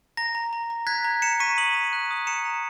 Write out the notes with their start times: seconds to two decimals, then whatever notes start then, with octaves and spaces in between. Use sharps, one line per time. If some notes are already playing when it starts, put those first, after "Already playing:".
0.17 A#5 A#6
0.35 A#5
0.53 A#5
0.70 A#5
0.87 F#6 G#6 B6
1.04 A#5
1.22 A#5 C#7 E7
1.40 C#6 B6 D#7
1.58 D#6 D#7 F#7
1.75 A#5
1.93 F#6
2.11 D#6
2.27 A#5 C#7 E7
2.45 A#5